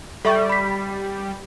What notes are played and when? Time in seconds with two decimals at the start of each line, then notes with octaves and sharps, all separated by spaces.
0.25 G3 A4 E5 C#6
0.49 B5 B6